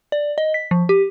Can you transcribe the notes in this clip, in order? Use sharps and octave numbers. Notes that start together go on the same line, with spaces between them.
D5
D#5
B6
F3
G4